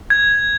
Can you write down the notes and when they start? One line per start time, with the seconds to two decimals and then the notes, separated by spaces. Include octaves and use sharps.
0.10 G#6